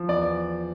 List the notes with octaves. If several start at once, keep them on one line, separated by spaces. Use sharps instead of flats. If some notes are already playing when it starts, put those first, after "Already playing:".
Already playing: F3
E2 D5